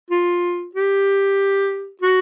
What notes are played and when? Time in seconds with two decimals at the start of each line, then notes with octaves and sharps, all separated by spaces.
0.10 F4
0.75 G4
2.01 F#4